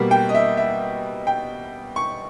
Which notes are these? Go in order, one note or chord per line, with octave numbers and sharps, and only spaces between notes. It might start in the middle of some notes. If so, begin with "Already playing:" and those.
Already playing: B2 G3 A#3
G5
D#5
E5
E5
G5
C#6